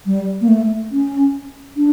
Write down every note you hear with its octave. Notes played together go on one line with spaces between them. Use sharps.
G3
A#3
A3
C#4
D4